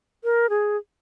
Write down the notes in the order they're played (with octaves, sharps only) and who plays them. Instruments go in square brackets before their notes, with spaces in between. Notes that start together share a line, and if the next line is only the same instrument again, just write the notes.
[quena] A#4
G#4